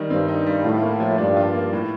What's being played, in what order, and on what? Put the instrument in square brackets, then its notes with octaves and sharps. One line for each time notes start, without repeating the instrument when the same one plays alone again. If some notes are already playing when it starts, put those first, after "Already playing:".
Already playing: [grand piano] D#3 G3 D#4
[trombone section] G2 [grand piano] C4
[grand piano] D#4
G3
[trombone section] A2 [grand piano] F4
[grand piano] A#3
F3
[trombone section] G2 [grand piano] D4
[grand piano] F4
A#3
A2